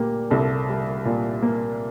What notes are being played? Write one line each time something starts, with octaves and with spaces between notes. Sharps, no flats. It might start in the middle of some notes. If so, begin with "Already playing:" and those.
Already playing: A#2 A#3 G4
C2 A4
G3
A#2
A#3